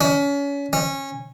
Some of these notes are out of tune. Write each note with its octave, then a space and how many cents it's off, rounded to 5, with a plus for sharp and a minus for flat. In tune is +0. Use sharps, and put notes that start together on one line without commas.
C#4 +30
C#4 -20